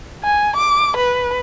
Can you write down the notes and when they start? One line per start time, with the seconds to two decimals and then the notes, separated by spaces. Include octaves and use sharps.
0.24 G#5
0.56 D6
0.97 B4